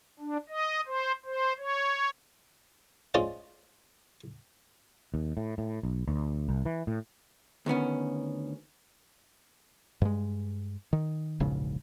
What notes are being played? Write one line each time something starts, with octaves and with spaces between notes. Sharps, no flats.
D4
D#5
C5
C5
C#5
G#3 C#4 F4 C5 D5 F5
D#2
A2
A2
B1
D2
C2
E3
A2
D2 D#3 B3 C#4
G2 G#3
D#3
E1 A#1 G#2 C#3